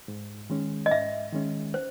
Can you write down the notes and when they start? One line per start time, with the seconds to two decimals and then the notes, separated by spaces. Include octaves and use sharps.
0.08 G#2
0.50 D#3 G#3 C#4
0.86 D#5
0.91 G#2 E5
1.32 D#3 G#3 C#4
1.74 C5